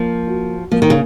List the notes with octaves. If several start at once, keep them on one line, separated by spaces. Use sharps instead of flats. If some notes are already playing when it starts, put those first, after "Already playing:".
Already playing: F3 A#3
F#4
F3 A#3
D#3
C#3